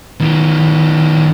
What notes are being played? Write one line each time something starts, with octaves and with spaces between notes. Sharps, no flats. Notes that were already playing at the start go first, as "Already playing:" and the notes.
D#3 B3